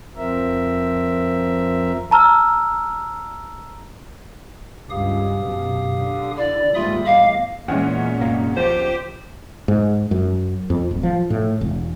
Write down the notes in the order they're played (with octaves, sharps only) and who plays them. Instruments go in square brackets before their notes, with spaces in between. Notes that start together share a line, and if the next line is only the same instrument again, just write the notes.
[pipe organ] F2 F3 C4 A#4 E5
[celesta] A5 A#5 E6 F6
[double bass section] C#2 G2 [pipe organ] G4 F5 D#6
[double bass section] F#2 B2
D3
[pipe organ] E4 [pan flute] D5
[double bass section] D#2 G#2 G3 [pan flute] F4 [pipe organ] E5 B5 D#6
[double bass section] E2 A2 [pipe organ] D#5 D6 [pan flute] F5
[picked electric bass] E2 [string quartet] A#2 [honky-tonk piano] G#3 C#4 F#5
[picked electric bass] F1 F#2 A#3
[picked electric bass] C#2 F3 [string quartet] G4 [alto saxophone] C5
[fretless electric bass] G#2
F#2
F2
D1
F3
A2
E1